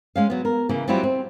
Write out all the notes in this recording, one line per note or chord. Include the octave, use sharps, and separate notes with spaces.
G#3 C#4 F5
F#3 B3
A#4
C#3 E3 A#3
F#3 G3 C4 E4 F4 G4
C4